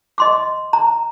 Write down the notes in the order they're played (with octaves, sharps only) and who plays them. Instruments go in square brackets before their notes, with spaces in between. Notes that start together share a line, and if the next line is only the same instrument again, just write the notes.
[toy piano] D#5 C6 D6
A#5